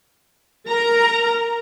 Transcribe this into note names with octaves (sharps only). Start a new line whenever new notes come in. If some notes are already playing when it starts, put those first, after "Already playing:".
A#4 A#5